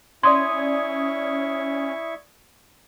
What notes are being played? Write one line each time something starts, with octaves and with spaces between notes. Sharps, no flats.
C#4 E4 D5 C6 C#6 D#6 G#6